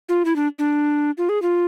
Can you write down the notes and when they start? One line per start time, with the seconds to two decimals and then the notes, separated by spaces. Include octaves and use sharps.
0.09 F4
0.25 E4
0.36 D4
0.59 D4
1.18 F4
1.29 G#4
1.42 F4